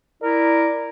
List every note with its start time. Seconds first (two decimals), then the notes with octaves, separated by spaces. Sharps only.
0.23 E4 A#4 D5